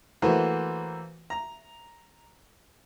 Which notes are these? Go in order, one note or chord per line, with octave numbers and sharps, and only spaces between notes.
E3 A3 A#3 F#4 B4 C5
A#5